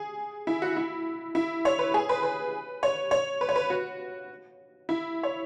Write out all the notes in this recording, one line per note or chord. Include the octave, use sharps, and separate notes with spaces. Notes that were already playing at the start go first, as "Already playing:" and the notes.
Already playing: G#4
E4
F#4
E4
E4
C#5
B4
G#4
B4
B4
C#5
C#5
B4
C#5
B4
F#4
E4
C#5